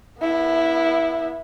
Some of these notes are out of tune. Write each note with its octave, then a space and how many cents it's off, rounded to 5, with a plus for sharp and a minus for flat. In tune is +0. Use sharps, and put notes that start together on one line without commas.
B3 -30 E4 +0